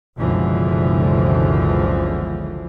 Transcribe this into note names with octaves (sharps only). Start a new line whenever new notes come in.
F#1 C#2 B2 D3 E3 F3